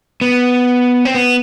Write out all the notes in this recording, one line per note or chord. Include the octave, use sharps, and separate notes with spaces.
B3
C4
B3